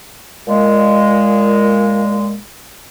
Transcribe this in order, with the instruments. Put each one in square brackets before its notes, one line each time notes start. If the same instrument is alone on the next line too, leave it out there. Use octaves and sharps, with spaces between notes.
[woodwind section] A#2 G#3